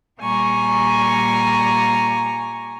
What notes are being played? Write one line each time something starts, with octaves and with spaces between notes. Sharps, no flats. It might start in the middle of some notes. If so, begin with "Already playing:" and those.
A#2 G3 G#5 A#5 C#6